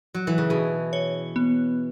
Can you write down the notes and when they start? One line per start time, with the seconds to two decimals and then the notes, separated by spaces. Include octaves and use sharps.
0.14 F#3
0.27 E3
0.38 C#3
0.50 B2 G#4
0.93 C#5
1.36 B3